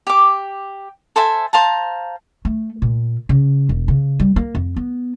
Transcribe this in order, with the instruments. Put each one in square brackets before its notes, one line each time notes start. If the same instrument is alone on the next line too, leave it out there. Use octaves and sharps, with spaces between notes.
[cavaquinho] G4 D6
A4 C5 E5 G#5
C5 F5 A5 A#5
[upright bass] A3
A#2
C#3
E1
C#3
G3
A#3
F2
B3